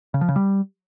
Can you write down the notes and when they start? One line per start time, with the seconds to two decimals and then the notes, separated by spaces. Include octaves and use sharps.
0.14 C#3
0.21 F3
0.29 C#3
0.36 G3